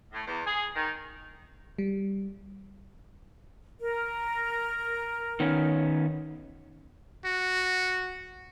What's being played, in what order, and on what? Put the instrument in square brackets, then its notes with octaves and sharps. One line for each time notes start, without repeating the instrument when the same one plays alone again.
[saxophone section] A2
E2
G#4
D#3
[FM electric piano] G3
[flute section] A#4
[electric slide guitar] D#3 B3 C#4
[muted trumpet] F#4